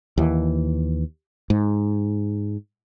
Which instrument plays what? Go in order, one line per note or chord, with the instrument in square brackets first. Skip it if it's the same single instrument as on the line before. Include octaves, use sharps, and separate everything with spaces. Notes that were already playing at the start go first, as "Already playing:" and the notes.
[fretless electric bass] D#2 E3
G#2